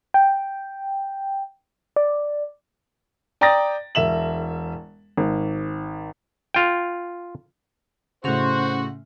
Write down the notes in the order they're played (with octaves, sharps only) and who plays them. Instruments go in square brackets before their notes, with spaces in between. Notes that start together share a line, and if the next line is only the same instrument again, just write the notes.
[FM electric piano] G5
D5
[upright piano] D5 G5 A#5 D#6 A6 A#6
E1 E5 E7 F#7
G#1
[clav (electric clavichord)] F4 G5
[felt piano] A2 C#3 [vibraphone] C#4 C6 [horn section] F#4 [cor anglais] C5